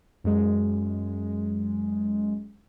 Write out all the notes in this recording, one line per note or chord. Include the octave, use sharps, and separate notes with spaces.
F#2 G#3